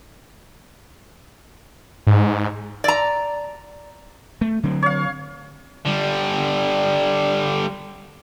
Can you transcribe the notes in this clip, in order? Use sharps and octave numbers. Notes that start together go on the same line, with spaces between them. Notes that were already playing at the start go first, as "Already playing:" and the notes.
G#2
D5 A#5
A3
D3 F#3 C4
C#5 F5
D3 G3